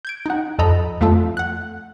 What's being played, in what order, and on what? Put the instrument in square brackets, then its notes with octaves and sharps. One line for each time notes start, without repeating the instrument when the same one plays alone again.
[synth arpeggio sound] G6 G#6 D7
D#4 F#5
F2 A4 D#5 A#5 B5
F2 A3 F4 A4
F#5 F#6